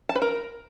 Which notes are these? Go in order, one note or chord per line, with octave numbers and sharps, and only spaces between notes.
A5
B4
A#4